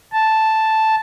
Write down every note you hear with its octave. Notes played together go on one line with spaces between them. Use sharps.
A5